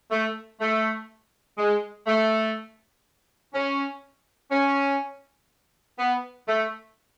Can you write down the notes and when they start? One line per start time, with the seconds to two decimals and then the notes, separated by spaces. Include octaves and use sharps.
0.10 A3
0.60 A3
1.58 G#3
2.07 A3
3.54 C#4
4.52 C#4
5.98 B3
6.47 A3